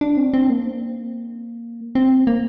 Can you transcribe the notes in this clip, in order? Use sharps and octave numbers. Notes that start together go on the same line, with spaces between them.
D4
C4
C4
A#3
C4
A#3